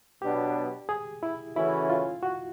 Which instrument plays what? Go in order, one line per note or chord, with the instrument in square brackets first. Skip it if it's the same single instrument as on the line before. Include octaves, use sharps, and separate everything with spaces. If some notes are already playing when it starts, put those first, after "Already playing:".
[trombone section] B2 F#3 B3 D4 [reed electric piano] G4
[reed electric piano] G#4
E4
[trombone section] C#3 E3 A3 C#4 F#4 [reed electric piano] E4
[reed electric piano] F4
F#4